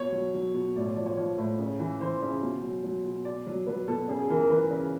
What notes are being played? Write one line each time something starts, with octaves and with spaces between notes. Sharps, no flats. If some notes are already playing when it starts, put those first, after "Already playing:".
Already playing: B2 C#5
F#3
F#3
B2
A2 D5
C#5
F3 D5
C#5
F3 C#5
A2
C#3
E3
E3 C5
C#3
B2
F#3
F#3
B2
B2 D5
F#3
F#3 B4
B2 A4
C#3 G#4
G#4
E3 A#4
A#4
E3 B4
C#3